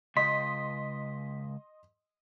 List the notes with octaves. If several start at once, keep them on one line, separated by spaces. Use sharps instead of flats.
C#2 D#5 C6 B6